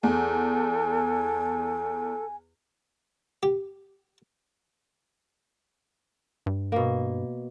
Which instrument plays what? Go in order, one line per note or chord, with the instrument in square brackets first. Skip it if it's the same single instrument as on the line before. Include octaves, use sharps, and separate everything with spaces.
[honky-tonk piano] E2 [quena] A4 [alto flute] G#5
[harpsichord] G4
[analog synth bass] G2
[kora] B2 A#3